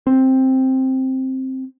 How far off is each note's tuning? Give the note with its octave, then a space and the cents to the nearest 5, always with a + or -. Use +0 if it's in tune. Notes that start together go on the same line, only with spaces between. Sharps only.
C4 +5